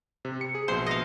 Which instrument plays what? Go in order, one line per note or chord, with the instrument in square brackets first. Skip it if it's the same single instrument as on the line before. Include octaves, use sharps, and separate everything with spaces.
[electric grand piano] C3
C#7
G#4
[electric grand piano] A#1 B2 [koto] C5
[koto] D#5 F5